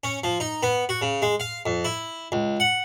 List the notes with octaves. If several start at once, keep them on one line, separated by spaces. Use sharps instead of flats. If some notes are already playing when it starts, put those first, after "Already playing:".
C#4
F3
D#4
B3
F#4
C#3
G#3
F5
F2
E4
C#2
F#5